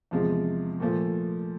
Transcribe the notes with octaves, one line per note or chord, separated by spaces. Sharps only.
E2 C3 F3 G#3
A#2 F3 A3